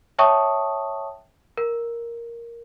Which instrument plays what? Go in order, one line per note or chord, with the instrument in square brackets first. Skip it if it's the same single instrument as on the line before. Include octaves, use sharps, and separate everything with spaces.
[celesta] C#5 E5 G5 A5 C#6 D#6
A#4